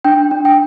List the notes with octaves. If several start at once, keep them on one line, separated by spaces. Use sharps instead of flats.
D4 G5
D4
G5